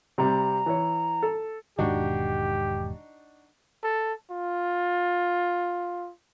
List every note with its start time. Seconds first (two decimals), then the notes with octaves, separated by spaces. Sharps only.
0.18 C3 G3 A#5
0.66 E3 C#5
1.23 A4
1.79 E1 G#2 D#3 D4 D#4 F#4 G4
3.83 A4
4.30 F4